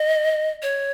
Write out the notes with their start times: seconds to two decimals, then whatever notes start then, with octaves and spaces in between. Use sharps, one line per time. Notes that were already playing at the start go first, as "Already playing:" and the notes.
Already playing: D#5
0.62 C#5